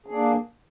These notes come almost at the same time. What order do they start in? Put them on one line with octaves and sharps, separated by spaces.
G#4 D4 A#3